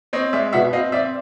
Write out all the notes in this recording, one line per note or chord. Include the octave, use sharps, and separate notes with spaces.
C4 C#5 D#5
G#3 D5 E5
B2 E5 F#5
C4 D#5 F5
C4 D5 E5